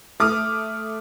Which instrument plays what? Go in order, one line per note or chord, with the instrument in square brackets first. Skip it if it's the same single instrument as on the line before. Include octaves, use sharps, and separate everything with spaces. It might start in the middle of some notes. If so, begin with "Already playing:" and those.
[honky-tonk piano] A3 D6 D#6 F6